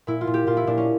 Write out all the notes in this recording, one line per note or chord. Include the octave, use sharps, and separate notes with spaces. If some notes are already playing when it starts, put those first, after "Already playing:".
A#2 E4
F4
A#2
G4
A#2 F4
E4
A#2 D4
C#4